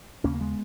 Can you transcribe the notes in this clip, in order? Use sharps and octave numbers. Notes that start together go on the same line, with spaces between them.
D#2 C#3 A#3 C#4
A#3
G#3 B3